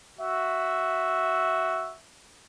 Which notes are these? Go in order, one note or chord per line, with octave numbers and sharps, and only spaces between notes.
F#4 E5